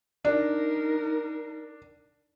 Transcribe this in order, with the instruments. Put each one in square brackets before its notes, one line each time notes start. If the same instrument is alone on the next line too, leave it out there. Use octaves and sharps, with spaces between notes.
[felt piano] D4 [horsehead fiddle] D#4 A#4